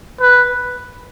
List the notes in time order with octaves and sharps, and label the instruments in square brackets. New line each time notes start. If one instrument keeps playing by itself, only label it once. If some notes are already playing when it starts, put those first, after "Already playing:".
[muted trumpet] B4